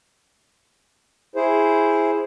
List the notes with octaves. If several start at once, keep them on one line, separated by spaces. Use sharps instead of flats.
E4 G#4 C5